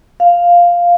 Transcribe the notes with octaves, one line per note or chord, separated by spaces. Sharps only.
F5